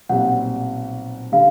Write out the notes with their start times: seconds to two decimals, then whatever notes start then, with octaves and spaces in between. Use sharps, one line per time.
0.09 B1 A#2 G3 C4 F#5
1.32 D3 G3 F5